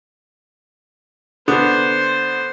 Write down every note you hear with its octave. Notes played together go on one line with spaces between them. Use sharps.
D3 B3 C5